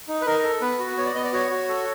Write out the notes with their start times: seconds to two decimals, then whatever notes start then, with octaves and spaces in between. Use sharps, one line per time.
0.08 D#4
0.21 B4
0.26 D#4 A#4
0.43 A4
0.61 B3 B4
0.79 F#4
0.98 B3 C#5
1.06 D5
1.15 B3 D#5
1.24 D5
1.33 F#4 C#5
1.51 F#4
1.68 A4